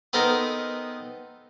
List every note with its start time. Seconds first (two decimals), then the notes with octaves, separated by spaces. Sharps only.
0.13 B3 C4 D#4 A4 A#4